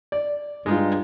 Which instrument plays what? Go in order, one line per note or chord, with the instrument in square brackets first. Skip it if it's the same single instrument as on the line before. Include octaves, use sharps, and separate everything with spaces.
[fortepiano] D5
[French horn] G2 [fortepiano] G#3 D#4 F4